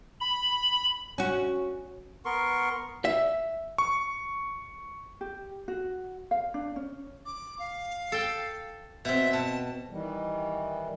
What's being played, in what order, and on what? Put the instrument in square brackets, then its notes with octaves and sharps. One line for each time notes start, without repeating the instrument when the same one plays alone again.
[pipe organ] B5
[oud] C#4 F#4
[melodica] B3 A#4 C6 C#6
[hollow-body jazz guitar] E5
[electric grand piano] C#6
[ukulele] G4
F#4
F5
D4
C#4
[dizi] D6
F5
[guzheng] A4 G5
[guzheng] B2 C4 [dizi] E5
[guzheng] B2 [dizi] A5
[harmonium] D#3 E3 G3